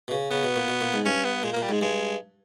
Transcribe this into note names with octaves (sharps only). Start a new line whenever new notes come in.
B2
C#3
C#3 B3
B2
A#2
B2
A#2
G#2
G2 C#4
B3
A#2 G#3
A#2 A#3
G3
G#2 G#3
G2 G#3